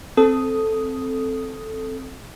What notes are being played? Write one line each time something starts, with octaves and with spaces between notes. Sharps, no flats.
C4 A4 D#6